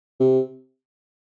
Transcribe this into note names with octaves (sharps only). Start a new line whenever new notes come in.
C3